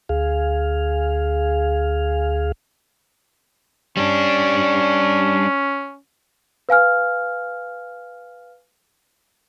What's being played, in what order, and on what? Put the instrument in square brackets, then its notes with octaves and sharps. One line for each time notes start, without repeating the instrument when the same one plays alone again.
[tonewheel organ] D2 G#4 F5
[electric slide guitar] G3 D4 [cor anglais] C#4
[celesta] B4 F5 G#5 F6